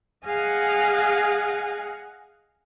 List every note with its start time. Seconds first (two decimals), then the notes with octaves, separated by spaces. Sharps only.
0.25 G#4 D#5 F5 F#5 G#5